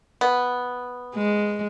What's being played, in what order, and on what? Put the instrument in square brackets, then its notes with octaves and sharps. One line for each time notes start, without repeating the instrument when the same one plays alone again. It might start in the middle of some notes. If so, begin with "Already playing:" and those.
[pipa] B3
[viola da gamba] G#3